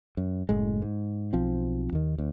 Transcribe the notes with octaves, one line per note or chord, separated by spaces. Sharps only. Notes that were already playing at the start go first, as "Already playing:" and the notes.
F#2
F#1 A2 G#3
G#2
B1 F3 C4
D#2 D#3
D2